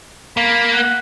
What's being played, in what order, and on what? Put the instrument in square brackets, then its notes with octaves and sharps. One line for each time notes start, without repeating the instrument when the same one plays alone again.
[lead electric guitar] A#3 [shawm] B5
[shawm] F#5